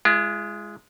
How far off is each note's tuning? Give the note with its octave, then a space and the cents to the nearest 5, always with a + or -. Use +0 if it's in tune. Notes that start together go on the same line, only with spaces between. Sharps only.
G#3 +0 F4 -45